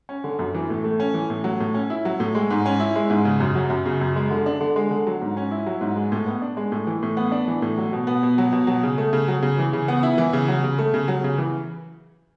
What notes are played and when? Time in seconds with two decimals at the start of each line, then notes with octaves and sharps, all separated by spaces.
0.09 C#4
0.24 D3
0.39 F#2
0.54 E3
0.70 A2
0.84 A3
1.00 C#4
1.14 E3
1.30 A2
1.44 F#3
1.60 A2
1.74 C#4
1.90 E4
2.05 F#3
2.20 A2
2.35 G#3
2.51 G#2
2.66 C#4
2.80 E4
2.96 G#3
3.10 G#2
3.25 C#3
3.40 F#2
3.55 F#3
3.70 F#2
3.86 C#3
4.01 F#2
4.16 G#3
4.30 D3
4.46 D4
4.60 D3
4.76 G#3
4.91 D3
5.07 F#3
5.21 G#2
5.37 C#4
5.51 E4
5.66 F#3
5.81 G#2
5.96 G#3
6.12 A2
6.26 B3
6.42 D4
6.57 G#3
6.72 A2
6.87 E3
7.03 A2
7.17 B3
7.32 D4
7.48 E3
7.62 A2
7.78 F#3
7.93 B2
8.07 B3
8.23 B2
8.38 F#3
8.53 B2
8.67 F#3
8.83 C#3
8.98 A3
9.13 C#3
9.28 F#3
9.42 C#3
9.58 E3
9.73 C#3
9.88 B3
10.03 E4
10.18 E3
10.33 C#3
10.48 F#3
10.64 C#3
10.78 A3
10.94 C#3
11.08 F#3
11.24 C#3
11.38 E3